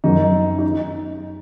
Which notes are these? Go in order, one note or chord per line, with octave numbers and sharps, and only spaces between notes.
F#2 D#3 F#3 D#4
D#4